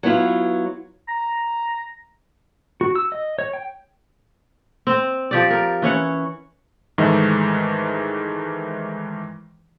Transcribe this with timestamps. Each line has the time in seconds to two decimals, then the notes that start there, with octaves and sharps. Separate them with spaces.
0.03 F#3 B3 E4 F4
1.08 A#5
2.81 F#4
2.95 E6
3.12 D#5
3.39 C#5
3.53 G5
4.87 C4
5.31 F3 G4 D5
5.50 A#4
5.82 E3 C#4 C#5 F#5
6.98 G#2 D#3 E3 G#3 A3